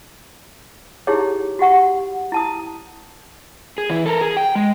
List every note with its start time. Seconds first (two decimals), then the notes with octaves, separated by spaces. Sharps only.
1.07 D#4 E4 G4 G#4 C#5
1.59 F#4 G4 F#5 C#6
2.32 E4 A5 D#6
3.78 G#4
3.89 E3 E4
4.06 A4 A#4
4.21 G#4
4.37 G5
4.55 G#3